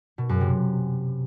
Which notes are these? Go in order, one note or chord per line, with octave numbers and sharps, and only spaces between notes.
B2
F#2
C3